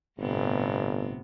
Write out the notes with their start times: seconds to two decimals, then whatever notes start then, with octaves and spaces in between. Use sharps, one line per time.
0.19 G1 A2 C3 B3